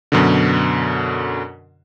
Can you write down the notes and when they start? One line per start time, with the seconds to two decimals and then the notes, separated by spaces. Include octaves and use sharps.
0.12 F#2 B2 D3